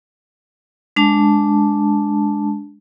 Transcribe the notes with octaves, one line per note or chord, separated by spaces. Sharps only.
G#3 D4 A5